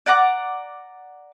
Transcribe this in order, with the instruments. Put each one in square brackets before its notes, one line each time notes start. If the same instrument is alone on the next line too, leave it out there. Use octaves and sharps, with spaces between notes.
[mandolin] D5 F#5 A#5 D6